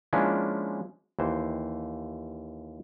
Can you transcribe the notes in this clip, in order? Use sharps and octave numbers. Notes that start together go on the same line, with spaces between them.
F3 G#3 A#3 C#4 D4 E4
D#2 E3 C5